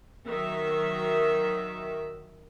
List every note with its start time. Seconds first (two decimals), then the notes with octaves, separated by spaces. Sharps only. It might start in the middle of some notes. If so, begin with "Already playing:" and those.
0.26 D#3 F#3 E5